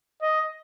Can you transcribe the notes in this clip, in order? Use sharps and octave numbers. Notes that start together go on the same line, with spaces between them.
D#5